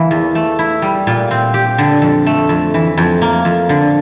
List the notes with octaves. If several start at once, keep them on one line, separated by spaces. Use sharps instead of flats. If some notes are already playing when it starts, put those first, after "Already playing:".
Already playing: E3 A#3
E2
A3
E4
G3
A#2
C4
G4
D3
F2
A3
F2
E3
F2
A#3
F2
D3